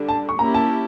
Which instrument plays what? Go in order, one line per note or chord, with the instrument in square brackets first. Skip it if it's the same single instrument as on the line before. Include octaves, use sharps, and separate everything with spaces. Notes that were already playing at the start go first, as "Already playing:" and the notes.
Already playing: [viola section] D3 G3 D4
[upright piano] A5
C#6
[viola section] A#3 C#4 E4 G4 [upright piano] A#5
[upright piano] A5